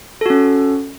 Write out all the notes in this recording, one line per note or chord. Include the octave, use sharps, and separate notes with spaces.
C#4 F#4 A4